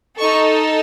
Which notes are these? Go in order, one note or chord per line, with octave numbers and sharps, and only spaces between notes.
D#4 A4 C#6